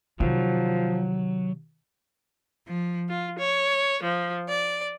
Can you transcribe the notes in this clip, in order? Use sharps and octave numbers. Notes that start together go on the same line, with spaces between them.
C3 D#3 F3 F#3
F3
F4
C#5
F3
D5